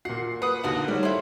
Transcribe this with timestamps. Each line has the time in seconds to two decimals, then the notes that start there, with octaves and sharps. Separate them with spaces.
0.05 A#2 F#4 F#5 C7
0.42 B4 F#5 D#6
0.64 D#2 D3 F#4 A#4 F#5 F#7
0.88 D#3 G3 C5 C#5
1.03 A3 E4 C6